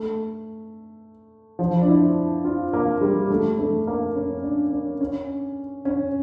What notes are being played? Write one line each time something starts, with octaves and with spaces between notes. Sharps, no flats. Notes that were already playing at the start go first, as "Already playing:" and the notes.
Already playing: A3
F3
D4
E4
F4
A#3
G3
A3
A3
A#3
C#4
D4
C#4
C#4
C#4